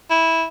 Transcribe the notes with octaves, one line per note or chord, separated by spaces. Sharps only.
E4